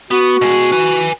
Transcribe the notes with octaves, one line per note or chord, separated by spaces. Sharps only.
B3 F#4
B2 G#4
B4 G#5